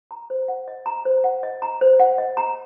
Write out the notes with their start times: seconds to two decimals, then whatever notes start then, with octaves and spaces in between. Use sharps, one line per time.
0.11 A#5
0.30 C5
0.48 F#5
0.68 D#5
0.86 A#5
1.05 C5
1.24 F#5
1.43 D#5
1.62 A#5
1.81 C5
2.00 F#5
2.18 D#5
2.37 A#5